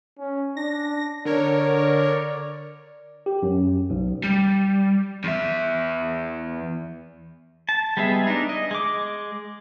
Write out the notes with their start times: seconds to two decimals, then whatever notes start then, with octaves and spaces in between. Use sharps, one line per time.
0.19 C#4
0.57 D4 A#6
1.25 D3 A#4 C#5 D5
3.26 G4
3.43 F#2
3.90 B1
4.24 G3
5.24 E2 E5
7.69 A5
7.97 G3 G#3 B3 G#4 E5
8.27 D4 D#4
8.49 D#5
8.71 G#3 D6